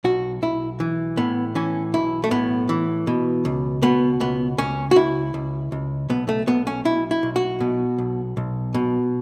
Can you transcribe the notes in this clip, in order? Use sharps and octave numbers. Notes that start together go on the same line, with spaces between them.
B1 F#4
B1 E4
E3
A2 B3
E3 C#4
B1 E4
A3
A2 B3
E3
B2
C#2
B2 B3
C#2 B3
C#2 C#4
F#4
C#2 E4
C#2
C#2
B1 B3
A3
B1 B3
C#4
B1 E4
E4
B1
F#4
B2
B1
B1
B2